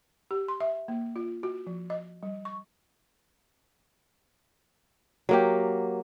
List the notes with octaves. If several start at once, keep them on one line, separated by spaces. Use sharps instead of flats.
G4
C6
E5
A#3
F4
F#4
F3
D#5
G3
C#6
F#3 A#3 G4